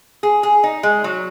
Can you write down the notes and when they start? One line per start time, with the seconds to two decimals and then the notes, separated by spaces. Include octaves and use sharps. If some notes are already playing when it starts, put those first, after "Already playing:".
0.23 G#4
0.43 G#4
0.63 D#4
0.83 G#3
1.04 F#3